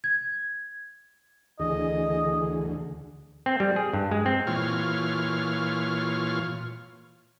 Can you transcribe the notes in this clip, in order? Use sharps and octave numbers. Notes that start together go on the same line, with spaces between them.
G#6
D2 D3 E3 G#4 D#5
C4
G3
G#4
G2
G#3
C4
A#2 E3 F4 C#5 F6